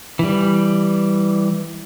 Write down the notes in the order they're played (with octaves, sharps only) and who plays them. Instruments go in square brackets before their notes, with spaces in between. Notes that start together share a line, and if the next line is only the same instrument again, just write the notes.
[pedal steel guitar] E3 G3